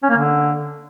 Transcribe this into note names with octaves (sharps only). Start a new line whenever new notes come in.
C#4
A#3
D3